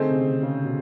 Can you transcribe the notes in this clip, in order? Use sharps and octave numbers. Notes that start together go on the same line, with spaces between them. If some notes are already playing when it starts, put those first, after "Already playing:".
Already playing: D3 A3 C4 D#4 G#4 C5
C3
C#3
C#3
B2